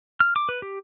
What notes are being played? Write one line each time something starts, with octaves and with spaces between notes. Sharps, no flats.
F6
D6
B4
G4